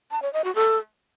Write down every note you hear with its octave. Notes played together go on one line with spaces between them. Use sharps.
A5
C#5
D#5
F#4
A4